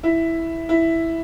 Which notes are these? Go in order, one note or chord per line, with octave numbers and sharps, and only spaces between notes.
E4
E4